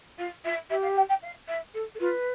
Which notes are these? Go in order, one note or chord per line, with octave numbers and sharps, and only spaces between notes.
F4 F5
F4 E5
G4 E5
F5
G5
G5
F5
E5
A4
A4
F4 B4